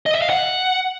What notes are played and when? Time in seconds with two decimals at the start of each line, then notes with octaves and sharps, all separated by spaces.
0.06 D#5
0.14 E5
0.22 F5
0.30 F#5